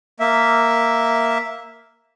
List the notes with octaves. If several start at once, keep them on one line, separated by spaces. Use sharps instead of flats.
A#3 E5